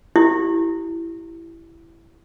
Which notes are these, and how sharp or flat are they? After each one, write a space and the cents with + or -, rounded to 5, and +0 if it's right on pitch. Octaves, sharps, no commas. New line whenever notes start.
E4 +10 G4 -25